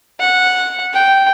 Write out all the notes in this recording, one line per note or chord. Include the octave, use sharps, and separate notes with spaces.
F#5
G5